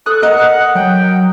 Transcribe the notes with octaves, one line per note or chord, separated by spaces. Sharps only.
A4 D#6 F#6
A#4 D#5 F#5
F#3 G5